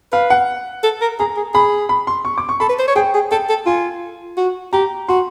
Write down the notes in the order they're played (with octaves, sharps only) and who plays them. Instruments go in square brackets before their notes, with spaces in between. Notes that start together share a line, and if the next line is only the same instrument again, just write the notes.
[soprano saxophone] B4 [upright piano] F5
[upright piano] F#5
[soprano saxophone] A4
A#4
[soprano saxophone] G#4 [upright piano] A#5
[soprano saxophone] G#4
[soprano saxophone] G#4 [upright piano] B5
[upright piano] B5
C6
C#6
D6
C#6
[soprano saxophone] A4 [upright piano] B5
[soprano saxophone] B4
C5
C#5
[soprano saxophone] G#4 [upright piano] G5
[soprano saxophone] G#4
[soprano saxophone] A4 [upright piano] G5
[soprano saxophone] A4
[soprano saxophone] F4 [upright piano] G#5
[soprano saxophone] F#4
[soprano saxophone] G4 [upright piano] A#5
[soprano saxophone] F#4 [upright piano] C6